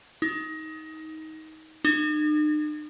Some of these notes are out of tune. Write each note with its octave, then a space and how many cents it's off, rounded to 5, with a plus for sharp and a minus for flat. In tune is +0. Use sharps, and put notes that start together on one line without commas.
D#4 +20
D#4 -45